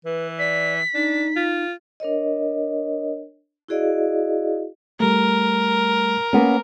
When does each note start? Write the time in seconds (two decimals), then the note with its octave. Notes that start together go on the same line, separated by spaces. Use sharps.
0.05 E3 B4
0.39 D5 B6
0.95 D4 D#4
1.36 F4
2.00 D4 A#4 C#5 D#5
3.68 E4 F#4 G#4 D5 D#5 F5
5.00 G3 A3 A#4
6.33 A#3 B3 C#4